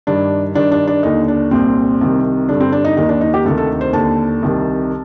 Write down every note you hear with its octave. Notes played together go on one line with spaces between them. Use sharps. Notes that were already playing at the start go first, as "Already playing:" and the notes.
G2 D#3 D4
G2 D#3 D4
D4
D4
D#2 D3 D#4
D4
C2 A#2 C4
C2 C3 D#3
G2 D3 D4
C4
D4
D#4
D#2 D#3 D#4
D4
D#4
G4
D2 C3 D#3 A4
A4
C5
D#2 D3 A5
C2 C3 D#3